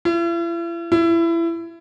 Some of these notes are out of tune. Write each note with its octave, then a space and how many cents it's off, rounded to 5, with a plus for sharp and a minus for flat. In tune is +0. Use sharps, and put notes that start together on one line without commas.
E4 +45
E4 +25